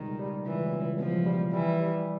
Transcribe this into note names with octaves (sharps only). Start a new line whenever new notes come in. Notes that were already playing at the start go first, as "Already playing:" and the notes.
Already playing: C#2 B2 D#3 G3
G3
C#2 E3
C#2
B2 F3
G3
E3 G3
G3